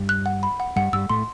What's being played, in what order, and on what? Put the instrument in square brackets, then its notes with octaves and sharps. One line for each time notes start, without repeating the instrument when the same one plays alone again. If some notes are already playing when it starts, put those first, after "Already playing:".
Already playing: [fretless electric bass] G2 G3
[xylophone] F#6
F#5
B5
F#5
[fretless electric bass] G2 G3 [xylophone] F#5
[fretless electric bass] G2 G3 [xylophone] E6
[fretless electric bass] A2 A3 [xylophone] C6